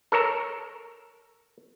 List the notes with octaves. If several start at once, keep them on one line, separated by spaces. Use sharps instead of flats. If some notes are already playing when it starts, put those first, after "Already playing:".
A4 A#4 C#5 A#5